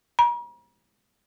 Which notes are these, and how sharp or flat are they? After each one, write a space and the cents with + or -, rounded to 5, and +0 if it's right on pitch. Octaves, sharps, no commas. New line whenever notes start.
A#5 +45